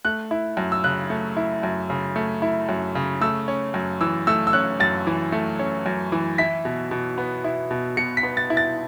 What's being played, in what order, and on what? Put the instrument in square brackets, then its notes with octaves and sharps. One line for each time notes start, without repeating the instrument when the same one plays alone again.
[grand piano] A3 F#6
E4
F#2
E6
C#3 F#6
A3
E4
F#2
C#3
A3
E4
F#2
C#3
A3 E6
C#4
F#2
E3 E6
A3 E6
E6
C#4 F#6
F#2 A6
E3
A3
C#4
F#2
E3
E4 B6
B2
B2
B3
E4
B2
B2 C#7
B6
B3
A6
E4
A6